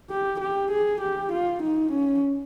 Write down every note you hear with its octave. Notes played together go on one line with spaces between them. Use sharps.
G4
G4
G#4
G4
F4
D#4
C#4